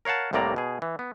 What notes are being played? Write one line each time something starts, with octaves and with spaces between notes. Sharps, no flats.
A#4 C#5 F5 F#5 A5
C2 A2 C3 A#3 D5 A#5
B2 G#4
E3
B3